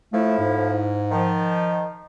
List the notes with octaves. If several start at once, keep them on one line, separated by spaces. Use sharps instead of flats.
A2 F3 A3 E4
G#2
D#3 F3